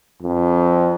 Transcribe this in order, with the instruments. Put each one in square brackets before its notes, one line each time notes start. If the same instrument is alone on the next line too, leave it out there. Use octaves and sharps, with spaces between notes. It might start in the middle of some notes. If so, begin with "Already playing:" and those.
[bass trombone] F2